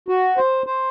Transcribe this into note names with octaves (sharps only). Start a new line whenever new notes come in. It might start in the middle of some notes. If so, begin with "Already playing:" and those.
F#4
C5
C5